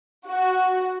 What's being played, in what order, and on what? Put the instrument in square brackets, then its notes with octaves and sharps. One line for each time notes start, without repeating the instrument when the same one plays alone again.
[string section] F#4